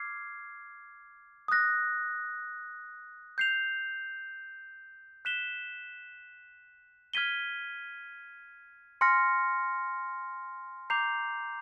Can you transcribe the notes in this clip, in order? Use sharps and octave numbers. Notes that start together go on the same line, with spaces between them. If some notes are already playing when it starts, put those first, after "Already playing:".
Already playing: D6 F6 G#6 C7
D#6 F#6 A#6
G6 C7 F7
F#6 B6 E7 G7
F6 G#6 B6 D#7 G7
G#5 C6 F6 A#6 C#7
A#5 D6 G6 C7 F7